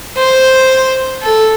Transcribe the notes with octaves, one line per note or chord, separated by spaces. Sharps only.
C5
A4